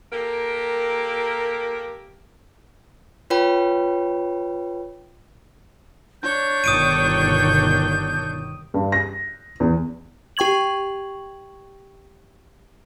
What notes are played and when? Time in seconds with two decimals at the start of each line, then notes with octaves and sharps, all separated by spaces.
0.12 A#3 G4 A4 A#4
3.30 F4 B4 C#5 G5 B5
6.23 D4 C#5 G6
6.64 G1 B2 D#3 D#6 D7 D#7
8.74 G2
8.92 A#6
9.60 E2
10.37 G4 G5 C#6 G#6 F#7